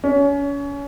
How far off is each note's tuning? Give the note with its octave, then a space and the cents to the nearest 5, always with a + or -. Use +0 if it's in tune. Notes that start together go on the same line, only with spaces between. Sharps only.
C#4 +30